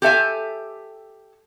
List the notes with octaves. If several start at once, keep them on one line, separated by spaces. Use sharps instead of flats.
G4 A4 E5 G#5